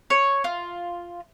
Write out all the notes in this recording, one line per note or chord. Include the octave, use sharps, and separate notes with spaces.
C#5
F4